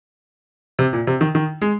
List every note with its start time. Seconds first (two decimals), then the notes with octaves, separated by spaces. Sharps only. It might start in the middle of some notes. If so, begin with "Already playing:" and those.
0.79 C3
0.93 A#2
1.07 C3
1.21 D#3
1.35 D#3
1.61 G#3